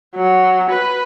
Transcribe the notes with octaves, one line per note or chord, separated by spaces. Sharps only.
F#3
B4